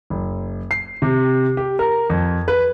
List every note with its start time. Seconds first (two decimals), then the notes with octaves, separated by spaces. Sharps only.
0.10 F#1
0.71 C7
1.02 C3
1.57 G4
1.79 A#4
2.10 F2
2.48 B4